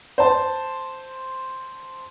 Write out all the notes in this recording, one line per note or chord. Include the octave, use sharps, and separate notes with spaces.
C5 A5